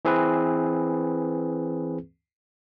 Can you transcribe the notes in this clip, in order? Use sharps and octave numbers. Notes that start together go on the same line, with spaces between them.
E3 C4 G#4 B4